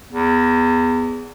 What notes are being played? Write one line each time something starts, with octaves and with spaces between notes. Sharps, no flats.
E2